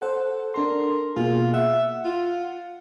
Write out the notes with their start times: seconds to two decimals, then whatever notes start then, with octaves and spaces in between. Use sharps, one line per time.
0.02 A4 C5 F#5
0.54 D4 A4 A#4 C6
1.16 B2 A#3 F4 G#4
1.54 E5 F#5
2.05 F4